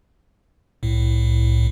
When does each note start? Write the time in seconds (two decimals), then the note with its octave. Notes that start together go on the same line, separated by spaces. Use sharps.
0.83 C2 A2